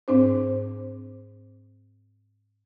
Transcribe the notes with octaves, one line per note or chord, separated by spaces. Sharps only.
G#2 C4 D4 C5